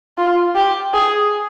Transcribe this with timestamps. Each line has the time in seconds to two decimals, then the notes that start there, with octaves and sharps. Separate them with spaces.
0.18 F4
0.55 G4
0.94 G#4